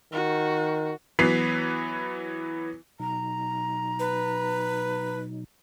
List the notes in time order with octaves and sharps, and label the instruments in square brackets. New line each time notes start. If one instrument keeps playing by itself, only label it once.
[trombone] D#3 [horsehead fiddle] F#4
[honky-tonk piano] E3 F#3 B3 B4 B6 C7
[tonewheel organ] B2 F#3 D#4 [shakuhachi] A#5
[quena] B4